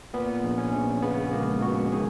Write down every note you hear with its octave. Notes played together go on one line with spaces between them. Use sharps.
A#2 B3
A#1
C#4
A#1
C#3 B3
C#2 A#3
C#2 F#4
D#3 G#4